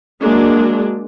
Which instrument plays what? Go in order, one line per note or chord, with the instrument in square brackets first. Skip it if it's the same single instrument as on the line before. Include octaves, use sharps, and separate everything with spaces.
[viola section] F#3 G#3 A#3 D4